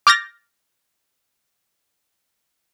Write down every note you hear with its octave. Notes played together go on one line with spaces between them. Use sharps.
D6 F6 G6 A6 A#6